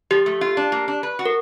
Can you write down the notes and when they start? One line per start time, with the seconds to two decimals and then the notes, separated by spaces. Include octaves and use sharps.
0.11 F3 G4
0.26 A3
0.41 F4
0.57 D4
0.72 A#3
0.88 D4
1.03 B4
1.19 F#4
1.26 A#4